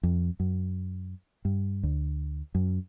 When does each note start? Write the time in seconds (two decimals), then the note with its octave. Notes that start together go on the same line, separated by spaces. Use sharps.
0.03 F2
0.40 F#2
1.45 G2
1.83 D2
2.55 F#2